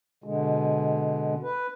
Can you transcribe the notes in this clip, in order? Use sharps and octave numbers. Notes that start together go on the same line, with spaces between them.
B2 D3 G#3
B4